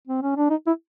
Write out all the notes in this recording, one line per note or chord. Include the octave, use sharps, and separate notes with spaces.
C4
C#4
D4
D#4
E4